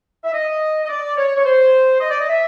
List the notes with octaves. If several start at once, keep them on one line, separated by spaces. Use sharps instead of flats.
E5
D#5
D#5
D5
C#5
C#5
C5
D#5
D5
D#5
E5